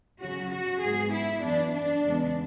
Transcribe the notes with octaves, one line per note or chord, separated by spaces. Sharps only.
C#3 F#3 C#4 F#4
F#4
G#2 G#3 B3 G#4
E4
F#2 E3 B3 D4
D4
E2 C#3 G#3 B3